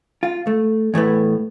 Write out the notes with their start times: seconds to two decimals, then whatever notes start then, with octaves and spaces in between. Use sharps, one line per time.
0.23 F4
0.47 A3
0.94 E2 A2 A3 B3